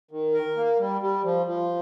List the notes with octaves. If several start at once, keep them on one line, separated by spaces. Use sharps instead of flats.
D#3
A#4
A#3
G3
G3
F3
F3